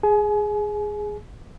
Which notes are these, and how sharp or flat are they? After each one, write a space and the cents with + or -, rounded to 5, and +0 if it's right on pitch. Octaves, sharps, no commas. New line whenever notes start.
G#4 +0 G#5 +35